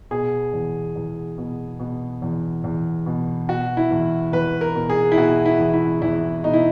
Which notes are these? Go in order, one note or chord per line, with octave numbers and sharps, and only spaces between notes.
B2 G#4
E2
E2
B2
B2
E2
E2
B2
B2 F#4
E4
E2
E2 B4
A#4
B2
G#4
E4
B2 F#4
E4
E2
E4
E2 E4
B2 D#4
E4